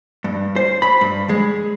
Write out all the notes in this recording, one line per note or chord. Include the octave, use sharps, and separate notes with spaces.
G2
C5
B5
G2
G#3